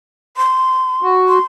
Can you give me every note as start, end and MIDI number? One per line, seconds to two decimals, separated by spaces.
0.37 1.15 84
1.02 1.38 66
1.28 1.43 84